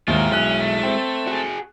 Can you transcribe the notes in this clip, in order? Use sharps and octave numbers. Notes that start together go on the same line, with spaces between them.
D#2 G#2 G#3 E4 F4 A#4
B1 C#4 F#6
A3
C4
F#4 G#4